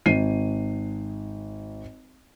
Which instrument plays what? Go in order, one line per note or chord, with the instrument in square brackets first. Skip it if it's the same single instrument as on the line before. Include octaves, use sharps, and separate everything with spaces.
[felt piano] G#1 C7 D#7